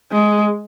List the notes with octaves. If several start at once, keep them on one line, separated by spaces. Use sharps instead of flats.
G#3